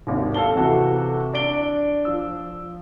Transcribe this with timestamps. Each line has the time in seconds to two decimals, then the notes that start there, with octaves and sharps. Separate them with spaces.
0.07 G#1 D#2
0.34 A4 F5 A5 G7
0.55 C3 E3 F#4 A4
1.34 D4 D5 D7 G7
2.05 F3 E6